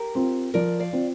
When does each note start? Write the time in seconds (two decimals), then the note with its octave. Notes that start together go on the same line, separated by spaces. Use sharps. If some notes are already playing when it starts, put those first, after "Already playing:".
Already playing: G4 A#4
0.15 C4 F4
0.54 F3 A#4 D5
0.80 D5 F5
0.93 C4 F4